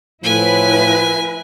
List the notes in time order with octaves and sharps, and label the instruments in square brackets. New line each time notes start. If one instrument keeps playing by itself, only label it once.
[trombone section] A2 [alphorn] F3 [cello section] E4 B4 [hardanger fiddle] G#5